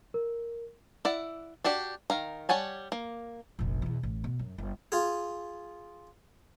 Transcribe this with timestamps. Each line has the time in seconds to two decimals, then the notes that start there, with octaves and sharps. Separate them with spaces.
0.14 A#4
1.05 E4 D5 F#5
1.64 D4 F#4 G4 D5
2.10 D#3 F5 A#5
2.49 G3 C#5 F#5 G#5 A5
2.92 A#3
3.59 F1 A#1
3.82 E2 B2
4.03 A1
4.24 B2
4.39 F#2
4.58 G1
4.92 F4 G#4